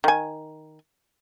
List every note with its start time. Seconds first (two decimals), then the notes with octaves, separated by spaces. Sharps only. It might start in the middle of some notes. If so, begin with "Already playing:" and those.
0.04 D#3 G#5